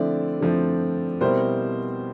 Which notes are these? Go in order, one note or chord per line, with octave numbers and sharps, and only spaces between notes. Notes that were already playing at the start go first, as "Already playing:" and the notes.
Already playing: D3 F3 A3 C4 E4 D5
D3 F3 A3 C4 E4
B2 G3 C4 E4 A#4 C5